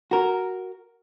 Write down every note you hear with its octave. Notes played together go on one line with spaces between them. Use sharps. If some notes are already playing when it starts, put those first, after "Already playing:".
F#4 A#4